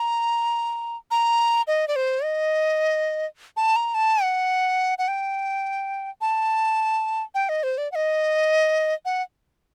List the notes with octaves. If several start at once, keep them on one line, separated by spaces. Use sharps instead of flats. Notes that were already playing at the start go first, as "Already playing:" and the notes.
Already playing: A#5
A#5
D#5
D5
C5
D#5
A5
A#5
A5
F#5
F#5
G5
A5
G5
D#5
C5
D5
F#5
D#5
F#5